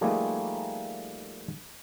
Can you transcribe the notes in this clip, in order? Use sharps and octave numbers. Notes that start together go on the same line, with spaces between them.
F3 G3 A3 A#3 D#4 G#4